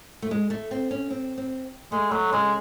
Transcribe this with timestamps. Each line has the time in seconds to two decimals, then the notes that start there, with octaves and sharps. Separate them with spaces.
0.22 A3
0.31 G#3
0.50 A3
0.71 C4
0.91 C#4
1.11 C4
1.38 C4
1.92 G#3 A3
2.11 F#3 A3
2.32 C#3 G#3